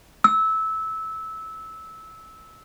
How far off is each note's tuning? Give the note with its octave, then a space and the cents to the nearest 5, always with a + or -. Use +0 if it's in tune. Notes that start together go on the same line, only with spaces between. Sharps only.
E6 -15